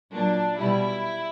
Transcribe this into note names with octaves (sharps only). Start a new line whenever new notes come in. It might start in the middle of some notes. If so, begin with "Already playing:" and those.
A#2 F#3 D4
B2 G3 E4